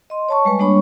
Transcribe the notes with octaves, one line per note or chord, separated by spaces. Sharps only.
D#5 C6
C#5 A5 C#6
G3 G#3 B4
G3 A#3 D4 C#5 B5 C#6